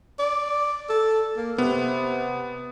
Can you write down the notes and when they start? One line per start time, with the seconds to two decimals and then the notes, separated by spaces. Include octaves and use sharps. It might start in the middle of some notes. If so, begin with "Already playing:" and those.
0.19 D5
0.89 A4
1.37 A#3
1.58 C3 B3